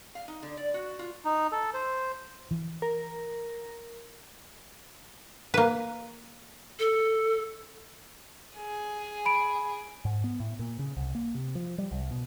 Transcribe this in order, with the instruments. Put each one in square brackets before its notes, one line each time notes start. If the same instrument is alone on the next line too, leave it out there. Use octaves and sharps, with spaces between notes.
[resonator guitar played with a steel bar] F5
D#4
D3
D5
F#4
F4
[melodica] D#4
A4
C5
[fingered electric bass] E3
[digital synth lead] A#4
[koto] A#3 B4
[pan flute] A4
[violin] G#4
[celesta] B5 D7
[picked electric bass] G#2
B3
A2
A#2
C#3
C2
A#3
C3
F3
G3
C2
B2